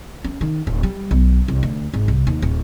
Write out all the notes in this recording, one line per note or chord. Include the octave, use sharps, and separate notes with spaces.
C#4
D#3
D1
G3
B1
C2
D2
G#1
C2
D#2
D1